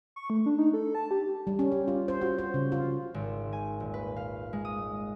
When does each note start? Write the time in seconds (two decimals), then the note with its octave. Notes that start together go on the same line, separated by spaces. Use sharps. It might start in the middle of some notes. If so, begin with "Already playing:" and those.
0.16 C#6
0.30 A3
0.46 D4
0.58 D#4
0.74 A4
0.95 A5
1.11 G4
1.47 G3
1.59 C#4
1.72 G4
1.88 F4
2.08 C5
2.21 F#4
2.39 C5
2.54 C#3
2.72 F4
3.14 G#1
3.53 G#5
3.80 D#1
3.94 B4
4.16 F5
4.53 G#3
4.65 D#6